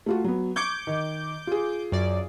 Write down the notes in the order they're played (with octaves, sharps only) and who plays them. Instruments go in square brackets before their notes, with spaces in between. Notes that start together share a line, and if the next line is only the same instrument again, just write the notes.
[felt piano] A3 F4 F#4
F#3 B3
[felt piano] C#6 G#6 C#7 [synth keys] D6 G6
[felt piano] D#3
F4 G#4
[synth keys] F#2 D5